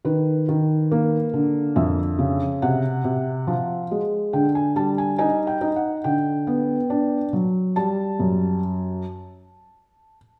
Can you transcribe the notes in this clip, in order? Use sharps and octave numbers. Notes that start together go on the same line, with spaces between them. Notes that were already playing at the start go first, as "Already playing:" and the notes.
D#3 B4
D#3
A#3
D3
F2 E5
C#3
C3 F#5
C3
F3
G#3
D3 G5
G#5
G3 A5
G#5
D#4 G#5
G5
D#4
F#5
D3 G5
B3
D4
F#3
G3 A5
F#2